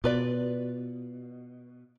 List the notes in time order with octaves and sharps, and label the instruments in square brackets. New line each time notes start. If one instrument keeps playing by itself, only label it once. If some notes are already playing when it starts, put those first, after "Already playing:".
[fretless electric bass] B2 [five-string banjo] F4 B4 D5